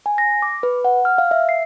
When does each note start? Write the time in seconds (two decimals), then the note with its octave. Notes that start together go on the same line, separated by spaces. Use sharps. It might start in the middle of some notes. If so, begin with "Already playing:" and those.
0.06 G#5
0.18 A#6
0.42 D6
0.63 B4
0.85 F#5
1.05 F6
1.18 F5
1.31 E5
1.49 C7